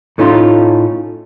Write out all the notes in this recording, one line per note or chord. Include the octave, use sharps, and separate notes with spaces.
A2 A3 C#4 D#4 F4 C6